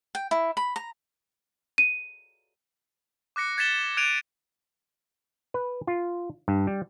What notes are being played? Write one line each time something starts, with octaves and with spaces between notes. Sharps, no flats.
G5
E4
B5
A#5
D#7
D6 F#6 A#6 C#7
F#6 G#6 A6 B6 E7 G7
F#6 G#6 D7 D#7 F7
B4
F4
G2
G3